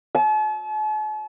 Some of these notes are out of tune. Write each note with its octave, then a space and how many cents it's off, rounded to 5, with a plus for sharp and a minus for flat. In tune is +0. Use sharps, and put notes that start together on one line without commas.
A5 -45